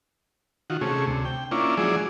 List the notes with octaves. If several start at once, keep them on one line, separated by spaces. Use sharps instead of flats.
D#3 F4 F#4
C3 A3 C#4 G#4
D2 C3
G5
A#3 C#4 D4 E4 F4
F3 F#3 G#3 E4 G#4 D5